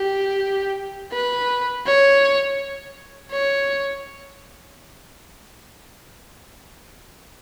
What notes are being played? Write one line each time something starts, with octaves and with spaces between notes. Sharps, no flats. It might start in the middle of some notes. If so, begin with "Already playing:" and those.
Already playing: G4
B4
C#5
C#5